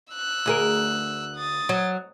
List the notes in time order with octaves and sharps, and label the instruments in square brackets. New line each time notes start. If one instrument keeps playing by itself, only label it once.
[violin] E6 F#6
[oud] D2 G#4 A#4
[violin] D#6 A6
[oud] F#3